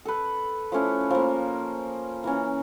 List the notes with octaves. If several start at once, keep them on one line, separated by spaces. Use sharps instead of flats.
A4 B4
F3 A3 C#4 E4
F3 A#3
E3 A#3 C#4